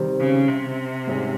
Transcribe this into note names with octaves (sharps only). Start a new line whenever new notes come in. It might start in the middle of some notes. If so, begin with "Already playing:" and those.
Already playing: C3 D#3 G3 C4
C#3
C3
G#2 G3 C#4 G#4